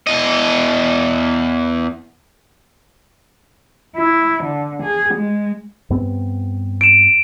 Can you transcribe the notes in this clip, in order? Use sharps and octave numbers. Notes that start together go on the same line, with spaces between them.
E2 D#5
E4
D3
G#4
G#3
G2 B3 C4
D7 E7